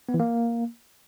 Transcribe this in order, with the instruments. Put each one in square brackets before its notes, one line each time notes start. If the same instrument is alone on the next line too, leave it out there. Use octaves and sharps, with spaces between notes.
[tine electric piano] B3
E3
A#3